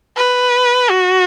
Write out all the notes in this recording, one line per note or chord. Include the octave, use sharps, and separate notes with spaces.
B4
F#4